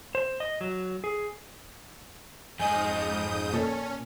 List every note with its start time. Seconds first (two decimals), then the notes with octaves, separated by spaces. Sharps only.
0.15 C5
0.40 D#5
0.61 F#3
1.04 G#4
2.59 F2 G#2 D#5 G#5 D#6 G6
3.54 A#2 C#4 A4